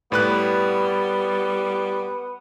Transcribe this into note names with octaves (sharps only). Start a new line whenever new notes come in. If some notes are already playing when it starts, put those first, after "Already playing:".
A2 G3 B3 B4 F#6